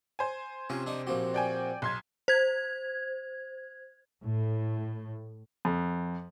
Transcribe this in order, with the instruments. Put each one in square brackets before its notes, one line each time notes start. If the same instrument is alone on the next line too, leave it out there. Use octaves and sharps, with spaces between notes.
[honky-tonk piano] C5 G#5
[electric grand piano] C3 [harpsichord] C#4 F4
[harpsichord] D4 D#4
[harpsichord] A#1 F3 G4 [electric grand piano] A#3 C4 F#4
[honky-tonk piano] D5 G5 G#5
B1 C6 G#6
[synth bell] C5 G#6
[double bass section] A2
[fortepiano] F2